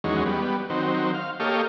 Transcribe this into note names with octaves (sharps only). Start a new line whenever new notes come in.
E2 D#3 F#3 G#3 C#4
G3 B3
D#3 F#3 C4
F5
A#3 G4 A4 C#5 D#5 F5